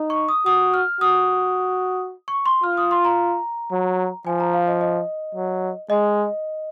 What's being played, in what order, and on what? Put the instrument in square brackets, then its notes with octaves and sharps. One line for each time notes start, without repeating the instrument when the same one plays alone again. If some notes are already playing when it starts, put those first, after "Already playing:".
Already playing: [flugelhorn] D#4
[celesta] C#6
D#6
[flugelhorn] F#4 [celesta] D#6
[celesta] F6
[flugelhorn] F#4 [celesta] D#6
[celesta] C#6
C6
[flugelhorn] F4 [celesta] F6
[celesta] D#6
C6
A#5
[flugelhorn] F#3
[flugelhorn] F3 [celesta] G#5
[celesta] A#5
F5
D#5
D#5
[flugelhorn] F#3
[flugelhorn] G#3 [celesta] D#5